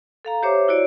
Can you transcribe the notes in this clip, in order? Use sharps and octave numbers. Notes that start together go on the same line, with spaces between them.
A4 F5 A#5
G4 C5 C#5 E5 D6
E4 F#4 C#5 D5